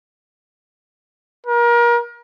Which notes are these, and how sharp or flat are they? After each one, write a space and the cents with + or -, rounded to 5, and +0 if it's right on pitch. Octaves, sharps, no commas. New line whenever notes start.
A#4 +30